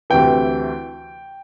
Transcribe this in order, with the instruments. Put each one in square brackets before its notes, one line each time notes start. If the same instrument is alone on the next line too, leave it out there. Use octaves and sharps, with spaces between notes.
[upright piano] D2 C3 E3 G5